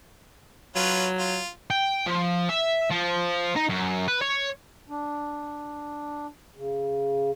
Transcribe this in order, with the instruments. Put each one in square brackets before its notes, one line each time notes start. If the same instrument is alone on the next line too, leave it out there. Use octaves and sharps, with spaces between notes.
[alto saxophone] F#3 [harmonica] C#4 F4 B4
[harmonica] F4
[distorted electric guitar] G5
F3
E5
F3
D#4
F#2
B4
C#5
[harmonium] D4
C#3